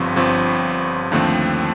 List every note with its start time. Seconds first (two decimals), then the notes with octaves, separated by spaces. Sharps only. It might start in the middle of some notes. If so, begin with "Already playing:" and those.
Already playing: G1 G2 F3 C4
0.16 G1 G2 F3 C4
1.12 D#2 D3 F3 A3 C4